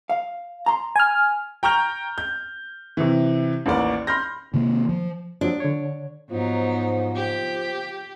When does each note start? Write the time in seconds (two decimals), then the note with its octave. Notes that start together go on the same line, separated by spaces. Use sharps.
0.10 F5
0.66 A#5 C6
0.96 G#5 F6
1.63 G5 A#5 C#6 F6 G6 F7
2.18 G6
2.97 C3 E3
3.66 A1 D#2 A#4 D5
4.07 B5 C6 F6 G6 A#6
4.54 C3 D#3 A#3
4.89 F3
5.41 F3 F#3 D4
5.60 D3 C#5
6.31 G#2 F3 F#3 B3 D#4
7.16 G4